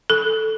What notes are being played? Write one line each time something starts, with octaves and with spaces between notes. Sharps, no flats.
A4